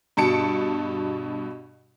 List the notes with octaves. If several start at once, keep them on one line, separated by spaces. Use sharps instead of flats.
G2 B2 A5 C#7 D7